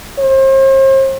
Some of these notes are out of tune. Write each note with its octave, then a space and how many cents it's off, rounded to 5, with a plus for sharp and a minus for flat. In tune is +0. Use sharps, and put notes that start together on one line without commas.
C5 +40